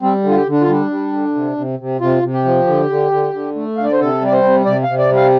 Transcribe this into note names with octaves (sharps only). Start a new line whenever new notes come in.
G3 C4
D3
F4
G4
D3
D4
F4
G3 D4
G3
D3
C3
C3
C3
C3 F4
C3
G4
F3
D3
D3
D3
D3
A3
D3 F5
D5
C5
C3 A4
G3 D5
C5
C3
C3 D5
C3 F5
D5
G3 F5